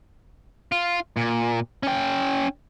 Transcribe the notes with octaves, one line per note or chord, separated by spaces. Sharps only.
F4
A#2
C#4 G5